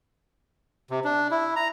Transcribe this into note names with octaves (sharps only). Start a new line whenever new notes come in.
C3
D4
E4
A#5